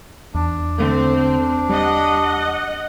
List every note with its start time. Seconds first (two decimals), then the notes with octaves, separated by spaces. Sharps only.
0.35 E2 D4
0.80 D3 A3 C4
1.69 G3 D#5 F#5